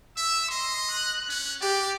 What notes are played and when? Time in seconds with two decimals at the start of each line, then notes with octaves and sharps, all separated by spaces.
0.17 E5 E6
0.50 D#5 C6
0.91 F#6
1.29 C#4
1.61 G4 D5